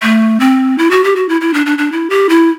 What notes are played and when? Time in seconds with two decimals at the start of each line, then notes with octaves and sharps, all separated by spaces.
0.03 A3
0.40 C4
0.78 E4
0.91 F#4
1.04 G4
1.16 F#4
1.29 E4
1.41 E4
1.54 D4
1.66 D4
1.78 D4
1.92 E4
2.10 G4
2.29 E4